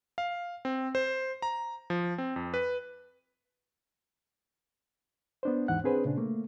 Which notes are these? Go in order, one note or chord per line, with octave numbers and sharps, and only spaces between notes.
F5
C4
C5
A#5
F3
C4
F2
B4
B3 D4 C5
D#2 G#2 E3 D#4 F#5 F#6
C4 D4 G#4 B4 C5
A#2 C#3 D4
A3 A#3